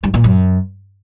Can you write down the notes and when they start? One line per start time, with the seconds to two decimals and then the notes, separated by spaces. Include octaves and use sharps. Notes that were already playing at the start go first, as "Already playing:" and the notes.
0.04 G2
0.14 A#2
0.24 F#2